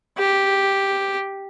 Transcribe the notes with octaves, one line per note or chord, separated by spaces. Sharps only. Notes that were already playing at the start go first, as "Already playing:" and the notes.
G4